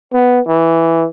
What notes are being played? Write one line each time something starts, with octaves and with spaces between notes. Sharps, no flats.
B3
E3